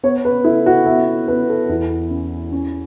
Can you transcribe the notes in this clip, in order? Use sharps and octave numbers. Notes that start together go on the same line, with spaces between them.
B3 C#5
B4
E4 A4
F#4
B3 E5
B3 B4
A4
E2 E4
C#4
C#4